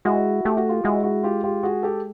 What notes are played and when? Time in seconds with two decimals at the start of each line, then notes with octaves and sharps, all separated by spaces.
0.05 G#3 E4 F#4
0.45 A3 G4
0.57 F#4
0.69 F4 G4
0.84 G#3 E4 F#4
1.04 E4 F#4
1.23 F4 G4
1.44 F4 G4
1.63 F#4 G#4
1.83 G4 A4